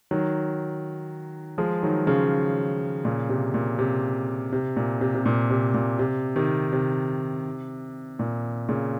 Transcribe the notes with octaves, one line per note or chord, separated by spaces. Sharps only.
D#3 F#3
F3 G#3
D#3 F#3
C#3 F3
A#2 C#3
C3
A#2
C3
C3
A#2
C3
C3
A#2
C3
A#2
C3
C3 D#3
C3
A#2
A#2 C#3